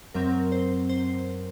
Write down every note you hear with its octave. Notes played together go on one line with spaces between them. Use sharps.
F#2 F#3 C4 A#4
C5
C5